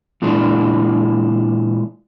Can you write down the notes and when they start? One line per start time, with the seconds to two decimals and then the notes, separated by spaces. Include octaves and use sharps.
0.22 A#2 E3 G#3 D4